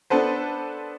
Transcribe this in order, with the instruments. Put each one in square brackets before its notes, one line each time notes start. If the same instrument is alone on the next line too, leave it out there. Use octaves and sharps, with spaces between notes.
[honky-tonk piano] B3 D4 A4 B4 C5